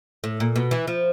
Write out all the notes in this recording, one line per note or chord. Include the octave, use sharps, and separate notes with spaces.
A2
A#2
B2
E3
F3